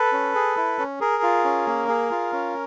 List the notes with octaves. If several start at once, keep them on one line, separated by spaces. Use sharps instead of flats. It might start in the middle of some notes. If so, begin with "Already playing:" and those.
Already playing: A4 B4
C#4
G#4
E4
C#4
G#4 A#4
F4
C#4
A#3
G#4
F4
C#4